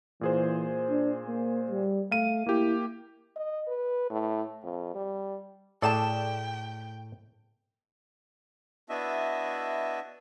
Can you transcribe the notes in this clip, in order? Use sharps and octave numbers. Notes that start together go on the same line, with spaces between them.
A#2 E3 G#4 C5
D4
A#3
G3
A3 F5 D#7
A#3 E4 G4
D#5
B4
A2
F2
G3
A2 A3 G#4 A4 D5 G5 A5 E7
B3 D4 E4 F#4 D#5 E5